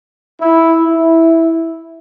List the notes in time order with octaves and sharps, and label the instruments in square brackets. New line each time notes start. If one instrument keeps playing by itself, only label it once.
[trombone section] E4
E4